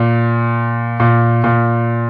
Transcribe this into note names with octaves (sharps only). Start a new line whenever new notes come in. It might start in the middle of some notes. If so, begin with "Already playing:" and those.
Already playing: A#2
A#2
A#2